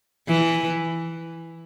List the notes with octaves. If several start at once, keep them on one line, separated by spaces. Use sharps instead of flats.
E3